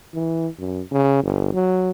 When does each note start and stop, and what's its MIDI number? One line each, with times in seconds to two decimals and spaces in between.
0.15 0.48 52
0.59 0.81 42
0.92 1.23 49
1.24 1.53 31
1.54 1.91 54